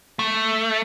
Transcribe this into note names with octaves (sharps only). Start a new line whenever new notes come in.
A3